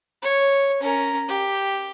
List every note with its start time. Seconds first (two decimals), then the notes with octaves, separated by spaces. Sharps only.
0.22 C#5
0.81 C#4 A#4
1.28 G4